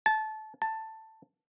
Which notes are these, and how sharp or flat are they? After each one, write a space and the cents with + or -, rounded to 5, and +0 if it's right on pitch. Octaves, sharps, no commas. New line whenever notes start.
A5 -20
A5 +10